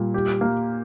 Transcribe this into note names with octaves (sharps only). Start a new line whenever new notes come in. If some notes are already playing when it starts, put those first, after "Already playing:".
Already playing: A#2 G3
G4
A#3